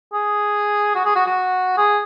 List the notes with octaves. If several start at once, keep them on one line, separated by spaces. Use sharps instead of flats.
G#4
F#4
G#4
F#4
F#4
G#4